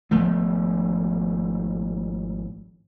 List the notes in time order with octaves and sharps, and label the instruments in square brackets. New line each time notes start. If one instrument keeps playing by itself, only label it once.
[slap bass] G#1 F3 A3 B3